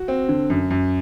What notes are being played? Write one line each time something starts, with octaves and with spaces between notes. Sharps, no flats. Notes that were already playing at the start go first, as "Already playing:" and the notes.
Already playing: F#4
C4
D3
F#2
F#2